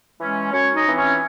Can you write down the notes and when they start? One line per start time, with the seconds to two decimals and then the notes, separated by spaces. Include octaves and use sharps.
0.18 E3 G#3 C#4
0.52 F#2 C#4 C#5
0.75 D#4 D#5
0.86 E3 C4
0.97 C#4 C#5